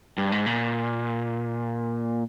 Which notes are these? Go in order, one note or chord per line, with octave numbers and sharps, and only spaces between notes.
G2
G#2
A#2